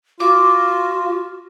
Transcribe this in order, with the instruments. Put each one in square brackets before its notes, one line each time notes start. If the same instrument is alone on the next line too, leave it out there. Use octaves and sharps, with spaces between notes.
[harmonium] F4 [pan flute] F#4 [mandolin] D6